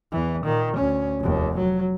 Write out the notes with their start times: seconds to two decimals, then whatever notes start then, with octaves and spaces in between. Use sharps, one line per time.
0.12 E2 E3
0.45 A#2 D#3
0.77 D2 C#4
1.20 F1 D#2
1.57 F#3